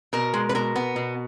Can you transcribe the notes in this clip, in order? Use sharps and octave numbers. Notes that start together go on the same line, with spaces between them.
B2 A#4
G#3
B4
B2 A#4
B3
B2